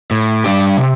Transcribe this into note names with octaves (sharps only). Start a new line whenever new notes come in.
A2
G3 D4 G4
C3